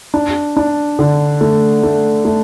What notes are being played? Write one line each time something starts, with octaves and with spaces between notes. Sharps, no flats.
D4
D4
D3
A3
A3
A3